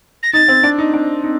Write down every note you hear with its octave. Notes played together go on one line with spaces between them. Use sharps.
A#6
D#4 A6
C4
D4
D#4
D4
D#4